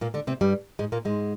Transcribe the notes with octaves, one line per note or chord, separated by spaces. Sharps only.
A#2 A#3
D3 D4
C3 C4
G2 G3
G#2 G#3
A#2 A#3
G#2 G#3